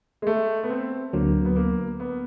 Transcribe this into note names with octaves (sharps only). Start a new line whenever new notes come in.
G#3
A3
B3
C4
D2 D3 F#3 A#3
B3
A#3
B3